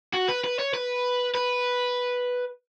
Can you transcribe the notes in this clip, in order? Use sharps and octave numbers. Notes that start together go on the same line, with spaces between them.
F#4
B4
B4
C#5
B4
B4